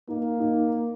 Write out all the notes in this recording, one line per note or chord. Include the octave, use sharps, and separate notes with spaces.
A#3 D#4
D#4